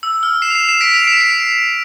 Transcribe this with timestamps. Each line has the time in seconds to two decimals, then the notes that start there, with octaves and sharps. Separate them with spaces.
0.03 E6
0.23 F6
0.42 C7 E7
0.50 F7
0.55 C7 E7
0.68 C7 E7
0.81 B6 D7
0.94 D7 F7
1.07 C7 E7
1.21 D7 F7